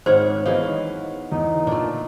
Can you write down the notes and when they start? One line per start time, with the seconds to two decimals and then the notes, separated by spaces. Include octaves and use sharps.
0.06 G#1 G#2 G#3 C5 C#5 F#5 F6
0.46 E3 F#3 G#3 B3 D#4 F5
1.32 E2 D#4
1.67 A#2 A3 D4